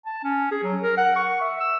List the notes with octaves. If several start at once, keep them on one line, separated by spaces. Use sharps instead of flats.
A5
C#4
G#4
F#3
A#4
F#5
C#6
E5
E6